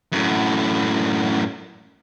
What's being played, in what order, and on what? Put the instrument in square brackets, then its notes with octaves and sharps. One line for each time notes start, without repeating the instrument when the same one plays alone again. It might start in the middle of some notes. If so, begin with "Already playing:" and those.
[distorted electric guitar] F#2 A2